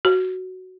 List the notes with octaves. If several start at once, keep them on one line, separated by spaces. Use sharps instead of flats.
F#4